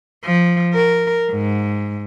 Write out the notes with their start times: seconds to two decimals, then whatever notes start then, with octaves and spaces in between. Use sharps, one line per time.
0.25 F3
0.73 A#4
1.31 G#2